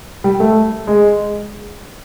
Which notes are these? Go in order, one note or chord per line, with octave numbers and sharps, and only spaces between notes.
G3
A3
G#3